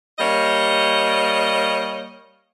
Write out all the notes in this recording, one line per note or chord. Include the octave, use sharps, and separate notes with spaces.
G3 A#3 C#5 D#5